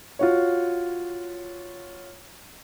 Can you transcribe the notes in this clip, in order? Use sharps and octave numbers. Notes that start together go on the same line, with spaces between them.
F4 F#4 C#5